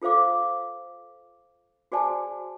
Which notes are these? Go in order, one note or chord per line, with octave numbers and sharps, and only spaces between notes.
F4 A4 C5 F5 D6
F#4 G#4 C5 D5 G#5 A5